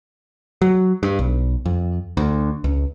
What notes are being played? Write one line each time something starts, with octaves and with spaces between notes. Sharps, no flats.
F#3
G2
B1
F2
D2
C#2